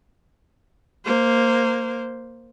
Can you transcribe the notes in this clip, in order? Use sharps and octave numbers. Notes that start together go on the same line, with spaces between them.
A#3 C5